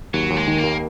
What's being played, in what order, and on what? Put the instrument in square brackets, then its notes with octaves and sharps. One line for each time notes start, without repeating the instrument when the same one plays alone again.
[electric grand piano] D#2 [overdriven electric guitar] F#3
[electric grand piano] D#2
[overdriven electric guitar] G#3
[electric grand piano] D#3
[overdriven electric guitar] A#3
[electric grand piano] D#2